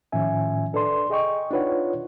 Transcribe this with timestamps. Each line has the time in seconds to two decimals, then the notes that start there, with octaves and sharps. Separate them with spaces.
0.12 A2 D#3 F3 C#4 E5 G#5
0.73 D4 A4 B4 D5 C6
1.10 G#4 D#5 G5 C#6
1.51 D4 D#4 F4 B4 C#5 F#5